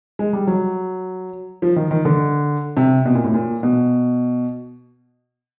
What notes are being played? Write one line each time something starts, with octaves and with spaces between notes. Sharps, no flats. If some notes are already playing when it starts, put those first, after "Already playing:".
G#3
G3
F#3
F3
D#3
D#3
D3
C3
B2
A#2
A2
A#2
B2